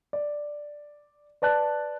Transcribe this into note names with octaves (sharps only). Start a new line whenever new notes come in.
D5
B4 D5 A5 F#6